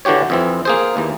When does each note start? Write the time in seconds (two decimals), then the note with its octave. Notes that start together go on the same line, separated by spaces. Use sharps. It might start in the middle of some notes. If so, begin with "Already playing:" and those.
0.05 D3 E3 F#4 G4 C#5
0.30 F2 E3 C4
0.65 A#3 G#4 C5
0.97 D#2 E3